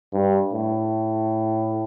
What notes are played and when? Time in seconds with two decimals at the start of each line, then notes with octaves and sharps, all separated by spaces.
0.13 G2
0.53 A2